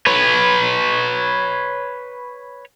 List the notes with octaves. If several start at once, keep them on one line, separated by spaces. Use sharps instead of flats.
B4 C#5